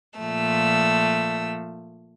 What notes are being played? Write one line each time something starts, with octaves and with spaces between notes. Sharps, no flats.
A#2 F3 A3 E6